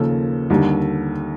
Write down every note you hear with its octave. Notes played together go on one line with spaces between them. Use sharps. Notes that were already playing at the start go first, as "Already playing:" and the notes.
Already playing: D#2 C#3 F3 A#3 A4
D#2 D3 G3